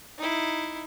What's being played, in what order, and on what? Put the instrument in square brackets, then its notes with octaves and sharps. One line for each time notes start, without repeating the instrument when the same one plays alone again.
[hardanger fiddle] D#4 E4